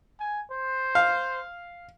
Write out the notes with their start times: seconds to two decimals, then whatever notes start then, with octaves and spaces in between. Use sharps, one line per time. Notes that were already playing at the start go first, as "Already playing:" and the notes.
0.20 G#5
0.51 C5
0.95 F5